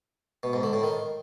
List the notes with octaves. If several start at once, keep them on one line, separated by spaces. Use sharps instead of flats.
B2
G#2
D3
A2
D#3